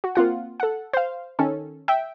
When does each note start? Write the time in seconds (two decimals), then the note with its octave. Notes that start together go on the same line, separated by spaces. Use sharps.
0.04 F#4
0.15 A#3 C4 F4 F#5
0.60 A4 F#5
0.93 C5 F5
1.39 D#3 C#4 A4
1.88 E5 G5